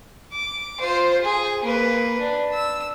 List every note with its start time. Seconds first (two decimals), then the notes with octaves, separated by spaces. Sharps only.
0.33 D6
0.80 F4 C5
1.22 G#4
1.64 A#3 B4
2.19 D4
2.53 E6